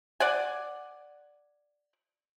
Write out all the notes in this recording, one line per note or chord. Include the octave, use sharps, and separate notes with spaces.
D5 F#5 G#5